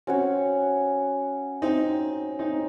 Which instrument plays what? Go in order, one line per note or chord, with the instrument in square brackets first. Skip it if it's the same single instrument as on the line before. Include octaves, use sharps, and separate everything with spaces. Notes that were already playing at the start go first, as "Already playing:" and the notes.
[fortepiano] C4 [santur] C#4 F#4 C#5
[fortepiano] C4 D#4
C4 D#4